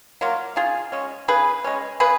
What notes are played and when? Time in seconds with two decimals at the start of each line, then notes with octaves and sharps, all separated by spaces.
0.21 F#3 A#3 F4
0.56 C#3 F4 G#4
0.92 G#3 C#4
1.28 C#3 G#4 B4
1.64 G#3 C#4
2.00 C#3 G#4 B4